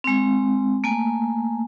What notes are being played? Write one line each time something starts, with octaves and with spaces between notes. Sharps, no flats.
G#3 C4
A3 A#3 G#5